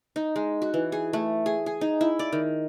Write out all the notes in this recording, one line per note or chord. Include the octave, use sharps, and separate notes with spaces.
D#4
G#3
F#4
E3
G#4
A3
G#4
G#4
D#4
E4
D5
D#3